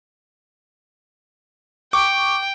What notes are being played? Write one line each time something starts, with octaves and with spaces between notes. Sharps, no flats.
G5 C#6 D6